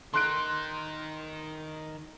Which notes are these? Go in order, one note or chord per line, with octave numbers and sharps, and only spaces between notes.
D#3 D#4 C6 F#6 D7